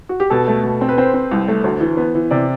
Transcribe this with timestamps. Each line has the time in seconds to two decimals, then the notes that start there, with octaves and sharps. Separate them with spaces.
0.09 F#4
0.20 G4
0.30 B2 A4
0.48 A3
0.64 B2
0.81 C4
0.89 B4
0.98 C4 C5
1.14 C4
1.31 C2
1.48 A3
1.64 D2
1.80 E3
1.97 B3
2.15 E3
2.31 C3 D5